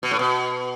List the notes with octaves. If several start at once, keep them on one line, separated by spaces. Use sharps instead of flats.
B2
A2
B2